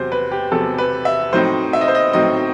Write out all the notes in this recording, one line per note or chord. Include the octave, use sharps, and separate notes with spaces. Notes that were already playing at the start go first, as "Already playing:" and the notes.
Already playing: E2 C3 F#3 C5
B4
G4
E2 C3 F#3 A4
B4
E5
A2 F#3 C4 D#4 C5
E5
D#5
C5
D#5
A2 F#3 C4 D#4 D#5